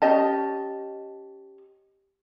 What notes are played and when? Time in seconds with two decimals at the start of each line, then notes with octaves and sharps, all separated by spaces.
0.02 C#4 G4 D#5 A5